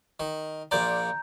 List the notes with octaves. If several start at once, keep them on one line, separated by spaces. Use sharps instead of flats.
D#3
A#1 A#2 D5 A#5 G6